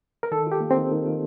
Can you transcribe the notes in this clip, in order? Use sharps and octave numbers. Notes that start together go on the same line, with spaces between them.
A#4
D#3 A4
F4 G4
A#3
C4
D#3
D#3
F4